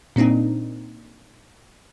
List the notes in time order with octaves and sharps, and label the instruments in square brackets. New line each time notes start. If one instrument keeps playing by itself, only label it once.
[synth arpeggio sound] A#2 A#3 C4 D4 D#4